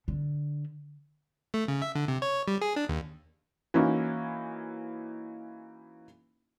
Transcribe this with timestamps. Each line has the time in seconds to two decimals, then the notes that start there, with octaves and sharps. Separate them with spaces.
0.08 D3
1.54 A3
1.68 C#3
1.82 E5
1.95 D3
2.08 C3
2.22 C#5
2.48 G3
2.61 G#4
2.76 D4
2.89 D#2
3.74 E3 A#3 C#4 D#4 E4 F#4